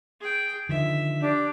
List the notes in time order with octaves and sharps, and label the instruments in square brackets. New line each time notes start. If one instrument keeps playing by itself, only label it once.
[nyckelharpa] G#4 G5
[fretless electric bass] D3 D#3 F3 [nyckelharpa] E5
[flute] D4 [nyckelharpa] G4